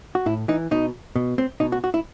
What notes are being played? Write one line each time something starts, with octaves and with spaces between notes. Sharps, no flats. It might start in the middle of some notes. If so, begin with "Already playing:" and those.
F#4
A2 E4
E3 D#4
B2 D#4
B2
C4
B2 D#4
F#4
F#4
E4